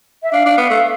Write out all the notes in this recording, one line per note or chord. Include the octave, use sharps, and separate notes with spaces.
E5
D4 F5
D4
B3
A3